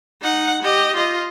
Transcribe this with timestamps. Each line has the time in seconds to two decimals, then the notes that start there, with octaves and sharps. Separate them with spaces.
0.22 D#4 F#5
0.62 G4 D#5
0.96 F4 D#5